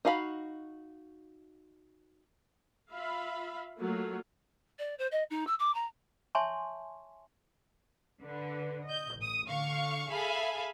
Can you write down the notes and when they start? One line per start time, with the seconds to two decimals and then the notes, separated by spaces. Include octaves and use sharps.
0.05 D#4 F#4 F5 G#5 B5
2.92 F4 E5 F5 B5
3.80 F#3 A3 A#3 F4 F#4
4.79 D5
4.99 C5
5.11 D#5
5.30 D#4
5.47 E6
5.59 D6
5.74 A#5
6.35 C#5 E5 G#5 A5 C6 C#6
8.21 D3 B4
8.85 D#5 G6
9.17 A1 D#6
9.48 D3 F5 C#6
10.11 G#4 A4 E5 F5 G#5 B5